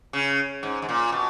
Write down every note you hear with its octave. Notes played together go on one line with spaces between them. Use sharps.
C#3
G#2
G#2
A#2
B2